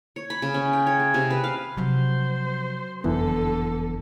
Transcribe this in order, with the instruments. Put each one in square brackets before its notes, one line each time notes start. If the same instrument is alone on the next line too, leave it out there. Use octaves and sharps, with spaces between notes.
[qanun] C#5
B5
C#3
C#4
G5
C#5
G#4
C3
B4
F5
[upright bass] C3 F3 [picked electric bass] F#3 [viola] C5
[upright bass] F#1 [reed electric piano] F2 E3 B3 [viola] D3 A4